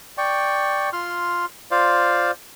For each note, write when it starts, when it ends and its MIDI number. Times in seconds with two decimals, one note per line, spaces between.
0.18 0.89 74
0.18 0.89 79
0.18 0.89 85
0.93 1.45 65
0.93 1.45 84
0.93 1.45 89
1.71 2.31 65
1.71 2.31 72
1.71 2.31 74
1.71 2.31 77